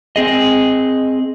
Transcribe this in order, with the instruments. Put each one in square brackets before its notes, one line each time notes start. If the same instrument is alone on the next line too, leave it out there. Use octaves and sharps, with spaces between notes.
[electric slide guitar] C4 G#4 D#5